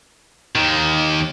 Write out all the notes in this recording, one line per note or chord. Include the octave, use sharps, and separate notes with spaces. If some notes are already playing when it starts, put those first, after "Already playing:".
D#2 D#3